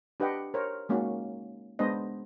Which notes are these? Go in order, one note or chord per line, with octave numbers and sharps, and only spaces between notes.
D4 G4 B4 D#5 F#5 G5
A#4 C5 C#5
G#3 A#3 C#4 D#4 F#4
G#3 B3 D4 C5 D#5